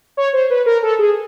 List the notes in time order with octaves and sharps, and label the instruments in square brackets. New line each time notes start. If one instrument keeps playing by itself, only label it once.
[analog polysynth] C#5
C5
B4
A#4
A4
G#4